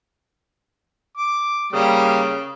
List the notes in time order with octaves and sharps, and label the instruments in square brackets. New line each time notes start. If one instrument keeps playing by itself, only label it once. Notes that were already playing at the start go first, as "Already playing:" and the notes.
[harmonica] D6
[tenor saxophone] C#3 [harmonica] G3 A#3